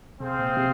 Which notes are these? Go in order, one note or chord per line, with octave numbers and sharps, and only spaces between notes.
C3 C4 G#4 C5 F5
A#2
C3